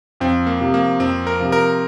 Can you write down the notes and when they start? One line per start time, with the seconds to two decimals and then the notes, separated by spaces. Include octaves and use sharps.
0.20 F2 C4
0.47 A#3
0.60 C3 F3
0.74 A#3
1.00 F2 C4
1.27 A#4
1.40 C3 F3
1.52 A#4